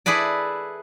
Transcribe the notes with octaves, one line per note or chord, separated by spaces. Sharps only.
E4 G#4 A4 B4 D5